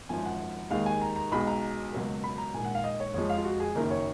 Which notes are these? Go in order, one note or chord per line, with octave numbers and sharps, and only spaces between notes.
G#1 F#2 F3 G#5
F#5
D#2 D#3 G#3 F5
G#5
A#5
A#5
B1 B2 G#3 B5
A#5
C#2 B2 F#3 A#3
B5
A#5
A#1 G#2 D#3 A#3 G#5
F#5
F5
D#5
C#5
F2 F3 G#3 C#5
F5
F4
F#4
G#4
F#1 F#2 D#3 A#4
C#5